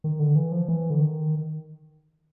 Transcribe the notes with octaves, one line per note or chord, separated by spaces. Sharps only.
D#3
D3
E3
F3
E3
D3
D#3